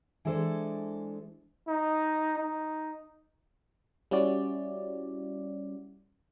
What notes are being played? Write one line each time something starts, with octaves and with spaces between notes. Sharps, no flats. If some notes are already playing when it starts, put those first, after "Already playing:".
E3 G#3 D4 A4 C5
D#4
D#4
G3 C#4 E4 F#4 D5